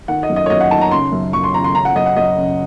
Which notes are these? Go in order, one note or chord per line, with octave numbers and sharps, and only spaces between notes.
D#3 F#5
D#5
F#2
D#5
C#5
F#2 D#5
F#5
D#3 A5
A#5
C#3 C6
F#2
F#2 C#6
C6
C#3 A#5
C6
C#3 A#5
F#5
F#2 D#5
F#5
F#2 D#5
C#3